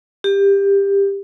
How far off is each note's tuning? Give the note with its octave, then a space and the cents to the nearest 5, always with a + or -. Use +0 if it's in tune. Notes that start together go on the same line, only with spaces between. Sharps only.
G4 +20